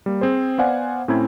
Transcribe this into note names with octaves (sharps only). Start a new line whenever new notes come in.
G3 A#3
C4 G#4 C5
B3 C5 D5 F5 F#5 G#5
A2 C4 C#4 E4 A#5 G#6